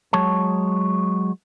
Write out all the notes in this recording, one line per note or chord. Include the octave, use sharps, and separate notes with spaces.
F#3 G#3 C#5 A5